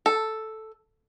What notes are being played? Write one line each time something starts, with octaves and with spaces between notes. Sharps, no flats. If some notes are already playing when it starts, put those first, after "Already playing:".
A4